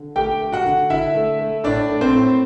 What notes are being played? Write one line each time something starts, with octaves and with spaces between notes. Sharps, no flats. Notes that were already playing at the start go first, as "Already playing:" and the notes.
Already playing: D3
A3 G4 G5
A3
F#4 F#5
D3
D3 E4 E5
A3
A3
A2 D4 D5
A3
C4 C5
A2